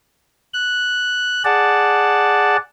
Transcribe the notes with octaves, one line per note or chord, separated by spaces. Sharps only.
F#6
G#4 D5 F#5 A5